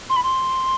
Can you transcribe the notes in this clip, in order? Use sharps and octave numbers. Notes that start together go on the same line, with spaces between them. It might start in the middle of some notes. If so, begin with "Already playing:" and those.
C6
B5
C6